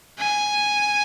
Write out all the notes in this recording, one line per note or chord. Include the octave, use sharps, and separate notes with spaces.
G#5